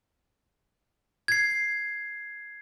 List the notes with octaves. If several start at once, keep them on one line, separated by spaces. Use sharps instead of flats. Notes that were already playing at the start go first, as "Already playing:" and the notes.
G#6 C7